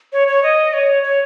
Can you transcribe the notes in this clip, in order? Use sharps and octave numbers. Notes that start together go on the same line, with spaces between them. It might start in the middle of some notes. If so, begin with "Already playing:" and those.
C#5
C#5
D#5
C#5
C#5